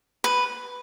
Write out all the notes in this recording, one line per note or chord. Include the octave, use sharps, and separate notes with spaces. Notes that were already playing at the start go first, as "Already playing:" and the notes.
B4